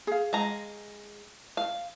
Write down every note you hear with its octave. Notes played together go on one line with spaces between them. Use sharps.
G#4 F5
G#3 A#5
F5